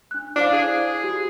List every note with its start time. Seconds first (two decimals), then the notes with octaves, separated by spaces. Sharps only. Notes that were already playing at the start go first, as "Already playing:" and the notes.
0.11 D4 F#6
0.36 D4 E4 C5 F5
0.53 G#4
1.04 F#4 G4